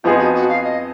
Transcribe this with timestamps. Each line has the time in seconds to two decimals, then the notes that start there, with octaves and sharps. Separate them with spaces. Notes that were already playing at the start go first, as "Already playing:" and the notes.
0.04 F2 F3 B3 D#4 F4 G#4
0.19 F#4
0.34 F#4
0.49 F5
0.64 D#5